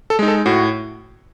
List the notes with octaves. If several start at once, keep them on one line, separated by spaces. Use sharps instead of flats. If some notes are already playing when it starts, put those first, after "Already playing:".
A4
G#3 D#4
A4
A2 F#4